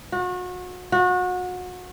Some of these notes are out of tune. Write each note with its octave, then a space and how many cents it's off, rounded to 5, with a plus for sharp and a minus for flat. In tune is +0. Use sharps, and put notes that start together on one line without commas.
F#4 -35
F#4 -30